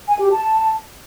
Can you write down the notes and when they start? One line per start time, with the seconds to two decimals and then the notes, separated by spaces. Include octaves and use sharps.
0.08 G#5
0.20 G4
0.31 A5